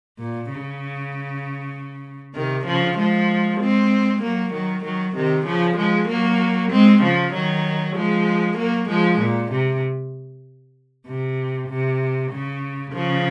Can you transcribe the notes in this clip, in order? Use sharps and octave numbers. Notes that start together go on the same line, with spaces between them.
A#2
C#3
C3 D#3
C#3 F3
F3 G#3
G#3 C4
F#3 A#3
D#3 F#3
D#3 F#3
C3 D#3
C#3 F3
F3 G#3
F#3 A#3
G#3 C4
C#3 F3
D#3 F#3
F3 G#3
F#3 A#3
F3 G#3
A#2
C3
C3
C3
C#3
C#3 F3